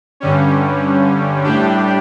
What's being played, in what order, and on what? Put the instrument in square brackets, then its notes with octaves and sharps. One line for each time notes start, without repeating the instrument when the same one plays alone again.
[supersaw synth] G2 D3 G3 C#4
A2 G3 D4 G4